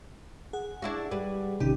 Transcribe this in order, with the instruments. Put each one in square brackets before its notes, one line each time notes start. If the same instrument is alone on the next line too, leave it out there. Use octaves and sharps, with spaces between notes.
[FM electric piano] G#4 F#5
[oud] D4 E4 F#4
G3 B4
[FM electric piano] A1 D#4 G5 [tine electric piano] C3 D#3 C#4 [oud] G4